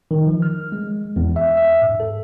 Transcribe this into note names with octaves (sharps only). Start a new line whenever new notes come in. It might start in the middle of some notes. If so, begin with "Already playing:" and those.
D#3
F3
F6
G#3
E2
E5
E5
G#2
A4